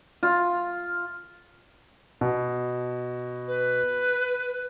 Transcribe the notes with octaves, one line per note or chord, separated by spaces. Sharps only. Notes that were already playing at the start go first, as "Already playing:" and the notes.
F4
B2
B4